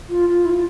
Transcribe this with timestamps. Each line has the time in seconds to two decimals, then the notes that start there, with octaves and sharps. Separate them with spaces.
0.09 F4
0.29 F4
0.45 E4
0.50 F4